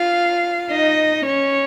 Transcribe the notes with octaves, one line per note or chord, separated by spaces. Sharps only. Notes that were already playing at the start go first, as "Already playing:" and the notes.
Already playing: F4 F5
D#4 D#5
C#4 C#5